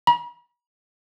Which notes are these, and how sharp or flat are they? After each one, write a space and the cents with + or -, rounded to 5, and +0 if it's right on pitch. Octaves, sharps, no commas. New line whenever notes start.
B5 -45